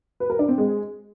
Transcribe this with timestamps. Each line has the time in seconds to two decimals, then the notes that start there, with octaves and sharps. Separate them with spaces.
0.20 B4
0.30 A#4
0.39 D4
0.48 C4
0.58 G#3